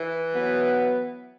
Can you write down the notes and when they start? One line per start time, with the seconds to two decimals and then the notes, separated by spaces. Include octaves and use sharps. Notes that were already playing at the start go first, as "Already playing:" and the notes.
Already playing: E3
0.34 F#3 B3